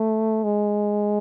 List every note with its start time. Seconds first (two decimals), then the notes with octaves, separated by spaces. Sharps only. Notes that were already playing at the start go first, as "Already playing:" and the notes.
Already playing: A3
0.44 G#3